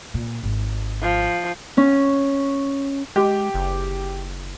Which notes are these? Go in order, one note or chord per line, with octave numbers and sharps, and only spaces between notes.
A#2
G#1
F3
C#4
G#3 G4
F#1